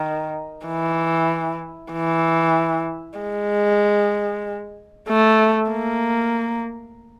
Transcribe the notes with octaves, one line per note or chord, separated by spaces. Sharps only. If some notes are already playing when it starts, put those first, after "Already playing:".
Already playing: D#3
E3
E3
G#3
A3
A#3